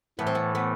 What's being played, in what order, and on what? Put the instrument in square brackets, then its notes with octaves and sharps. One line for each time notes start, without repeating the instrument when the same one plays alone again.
[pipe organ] A2 E3 A3 [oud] B3
[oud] C4
B3
B3